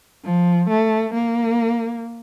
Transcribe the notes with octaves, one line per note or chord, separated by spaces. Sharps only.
F3
A3
A#3